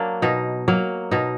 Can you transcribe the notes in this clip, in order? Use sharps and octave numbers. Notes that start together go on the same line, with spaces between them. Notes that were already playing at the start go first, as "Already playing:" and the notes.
Already playing: F#3 A#3 D4
B2 D#4
F#3 A#3
B2 D#4